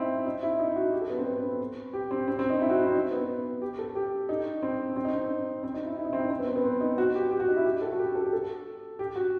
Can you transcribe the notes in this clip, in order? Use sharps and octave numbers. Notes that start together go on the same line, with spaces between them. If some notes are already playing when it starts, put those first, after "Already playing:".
Already playing: C4 D#4 E4
D#4
E4
D#4
F#4
G4
A4
B3
C4
B3
G4
C4
C4
C4
D#4
E4
F#4
E4
C4
D#4
B3
G4
A4
G4
D#4
C4
C4
D#4
C4
C4
D#4
E4
E4
D#4
C4
D#4
C4
B3
C4
B3
C4
D#4
F#4
G4
G4
F#4
D#4
E4
G4
A4
F#4
G4
A4
G4
A4
G4
F#4